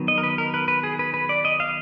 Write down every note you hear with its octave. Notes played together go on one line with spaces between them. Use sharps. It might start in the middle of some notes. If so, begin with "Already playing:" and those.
Already playing: D#3 F#3 B3
D#5
A#4
B4
A#4
B4
B4
G#4
B4
B4
D5
D#5
F5